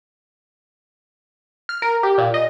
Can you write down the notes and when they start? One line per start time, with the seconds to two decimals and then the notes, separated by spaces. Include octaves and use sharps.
1.69 F6
1.82 A#4
2.03 G4
2.18 A#2
2.34 D#5